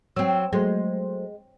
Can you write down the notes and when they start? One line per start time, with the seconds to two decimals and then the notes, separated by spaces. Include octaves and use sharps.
0.16 F#3 C4 E6
0.53 F#3 G#3 A3 C5